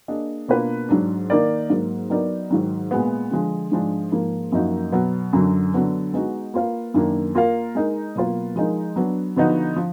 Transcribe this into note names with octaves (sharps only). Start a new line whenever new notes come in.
A#3 D4 G#4 D#5
B2 A#3 D4 F4 B4
G#2 F#3 D4
D#3 A#3 D#4 A#4 D5
G#2 F#3 A#3
F#3 B3 D#4 A#4 D5
G#2 D#3 F#3
A#2 G#3 B3
D3 F3 G#3
G#2 F3 G#3 D4
G#2 F3 A#3
F#2 F3 A#3 D#4 F#4
B2 F#3 B3
F#2 D3 F#3
D3 F#3 B3 D4
G#3 B3 D#4 F#4
A#3 F4 B4 F5
F#2 D#3 A#3 D4
A#3 F4 A#4 F5
G#3 D#4 A#4
B2 F#3 A#3 F4 B4
F3 G#3 D#4 A#4
F#3 B3 D4
D3 F3 B3 D#4 F#4
F3